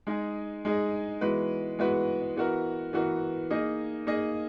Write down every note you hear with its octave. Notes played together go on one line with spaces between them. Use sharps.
G#3 D#4 G#4
G#3 D#4 G#4
E3 G#3 B3 F#4 B4
E3 G#3 B3 F#4 B4
E3 B3 F#4 A#4
E3 B3 F#4 A#4
A#3 D#4 G#4 D#5
A#3 D#4 G#4 D#5